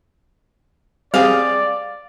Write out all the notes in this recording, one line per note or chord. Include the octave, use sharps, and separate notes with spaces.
G3 C4 G#4 D5 F5